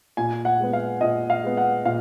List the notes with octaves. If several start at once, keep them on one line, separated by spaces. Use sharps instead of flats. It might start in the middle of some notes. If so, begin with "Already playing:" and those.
A#2 G#5
F#5
G#3 B3
F5
A#2 D#5
F5
G#3 B3
F#5
A#2 F5